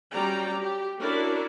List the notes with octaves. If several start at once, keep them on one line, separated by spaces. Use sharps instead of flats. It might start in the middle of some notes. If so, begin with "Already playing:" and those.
F#3 G3 C#4 D5 G5 A#5
G4
C#4 D4 E4 F#4 A#4 D5